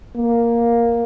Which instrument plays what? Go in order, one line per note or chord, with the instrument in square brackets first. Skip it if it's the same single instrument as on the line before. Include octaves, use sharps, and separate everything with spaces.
[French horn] A#3